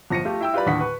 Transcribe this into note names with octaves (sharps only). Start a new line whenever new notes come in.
G1 F3 A#6 C#7 D#7
A3 F4 G4
E4 G5 E6
F4 G4 B4 D5 B5
D#2 A2 D3 F#5 D#6 B6
B4 C#6